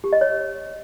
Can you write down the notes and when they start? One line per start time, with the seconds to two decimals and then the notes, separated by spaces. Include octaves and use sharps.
0.04 G4
0.13 D#5
0.21 C#5